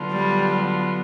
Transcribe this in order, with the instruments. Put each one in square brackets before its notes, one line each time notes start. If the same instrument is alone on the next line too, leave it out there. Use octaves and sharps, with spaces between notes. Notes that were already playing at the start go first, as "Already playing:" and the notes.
Already playing: [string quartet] D3 F#3 B3 D4 F4
[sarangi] G3